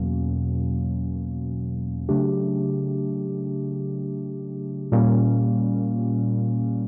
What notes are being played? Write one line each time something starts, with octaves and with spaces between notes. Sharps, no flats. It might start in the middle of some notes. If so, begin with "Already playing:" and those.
Already playing: E2 B2 F#3 A#3 C#4
C#3 F#3 A3 D4 G4
A#2 G3 A#3 C#4